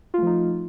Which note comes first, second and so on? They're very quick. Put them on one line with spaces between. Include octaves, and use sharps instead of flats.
F4 A3 F3 D#4